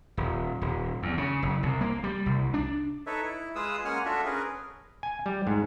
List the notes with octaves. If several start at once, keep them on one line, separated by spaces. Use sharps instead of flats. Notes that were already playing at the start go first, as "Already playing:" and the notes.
D#1
D#1
E2
C#3
F#1
C2
A#3
G3
C2
D4
D#4 A4 B4 C#5 E5
E4
G#3 F4 G#4 B4 D#6 E6
G#3 A#3 C#4 F#5 G#5 F6
D4 F4 F#4 A4 E5
C#4 G#4 A#4 B4
G#5
G3
G#2